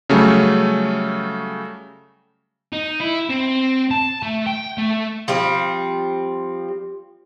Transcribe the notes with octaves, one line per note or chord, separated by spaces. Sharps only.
C#3 F#3 G3 A3 C#4
D#4
E4
C4
A5
A3
G5
A3
F3 G3 C4